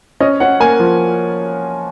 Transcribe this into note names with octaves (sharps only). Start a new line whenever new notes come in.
C#4 D#5
C#4 F#5
A#3 G#5
F3